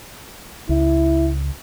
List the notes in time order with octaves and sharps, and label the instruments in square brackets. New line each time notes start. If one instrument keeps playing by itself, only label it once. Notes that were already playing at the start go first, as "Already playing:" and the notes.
[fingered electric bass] C#2 [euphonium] E4